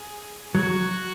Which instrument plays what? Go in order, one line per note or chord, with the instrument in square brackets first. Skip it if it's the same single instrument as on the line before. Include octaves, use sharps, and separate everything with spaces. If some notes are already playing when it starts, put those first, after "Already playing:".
Already playing: [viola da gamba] G#4
[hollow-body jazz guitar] F#3 [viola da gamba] F#4